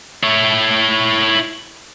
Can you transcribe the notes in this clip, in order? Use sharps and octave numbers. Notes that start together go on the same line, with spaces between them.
E4 C#5